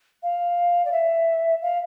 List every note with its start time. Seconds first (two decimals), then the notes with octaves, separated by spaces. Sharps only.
0.23 F5
0.85 D5
0.92 E5
1.62 F5